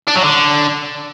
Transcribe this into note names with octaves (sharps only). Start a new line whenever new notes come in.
D4
F#3
D3